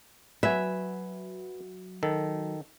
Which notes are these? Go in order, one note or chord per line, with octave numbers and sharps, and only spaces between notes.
F#3 F#4 B4 E5 G#5
D#3 A4